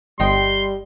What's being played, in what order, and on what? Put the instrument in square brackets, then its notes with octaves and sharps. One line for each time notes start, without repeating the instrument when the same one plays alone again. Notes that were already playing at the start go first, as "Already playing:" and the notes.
[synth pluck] G1 [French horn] G3 [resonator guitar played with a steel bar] D#5 G5 [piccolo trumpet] C6